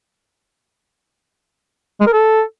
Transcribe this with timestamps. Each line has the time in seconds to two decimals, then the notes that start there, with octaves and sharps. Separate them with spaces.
2.01 G#3
2.07 A#4
2.13 A4